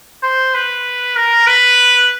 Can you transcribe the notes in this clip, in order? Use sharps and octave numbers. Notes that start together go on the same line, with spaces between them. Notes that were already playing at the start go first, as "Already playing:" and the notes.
C5
B4
A#4
B4